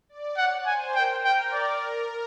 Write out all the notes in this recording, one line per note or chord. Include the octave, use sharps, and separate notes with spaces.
D5
C#5 F#5
C5 G#5
A#4 G5
A#4 G5
D5